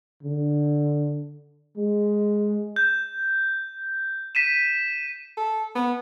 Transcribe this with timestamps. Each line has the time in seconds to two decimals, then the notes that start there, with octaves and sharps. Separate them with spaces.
0.23 D3
1.77 G#3
2.76 G6
4.35 B6 D#7 E7
5.38 A4
5.75 B3